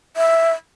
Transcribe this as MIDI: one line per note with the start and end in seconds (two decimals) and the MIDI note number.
0.17 0.52 76